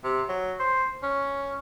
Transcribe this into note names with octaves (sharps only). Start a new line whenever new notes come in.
C3
F#3
C5
C#4